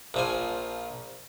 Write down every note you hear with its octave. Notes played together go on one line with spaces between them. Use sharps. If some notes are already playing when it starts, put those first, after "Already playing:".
A#1 F3 G#5